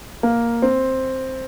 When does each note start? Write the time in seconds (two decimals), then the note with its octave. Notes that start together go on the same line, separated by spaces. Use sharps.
0.23 A#3
0.62 C4